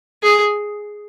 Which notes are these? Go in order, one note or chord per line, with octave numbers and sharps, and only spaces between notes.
G#4